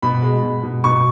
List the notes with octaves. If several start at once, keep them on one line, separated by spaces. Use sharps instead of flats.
B2 B5
G#3
B2
B2
B2 C#6